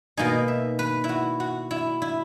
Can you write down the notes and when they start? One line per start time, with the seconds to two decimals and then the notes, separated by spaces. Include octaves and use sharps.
0.17 B2 A#3 D#4 G#5
0.48 E5
0.79 B4
1.04 E4
1.09 F#4
1.40 F#4
1.71 E4
2.02 E4